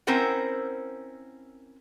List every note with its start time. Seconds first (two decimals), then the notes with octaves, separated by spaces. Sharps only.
0.07 C4 C#4 E4 A#4 C5 F#5